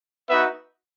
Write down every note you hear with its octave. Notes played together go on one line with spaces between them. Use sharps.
B3 D#4 F#4 B4 E5